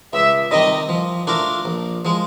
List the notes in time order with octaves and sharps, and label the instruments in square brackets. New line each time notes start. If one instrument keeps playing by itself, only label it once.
[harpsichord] C#2 [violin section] E5
[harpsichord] C3 D#3 G3 [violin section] D#5
[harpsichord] F3
A3 D4 F4 A#4
A#1
F3 G#3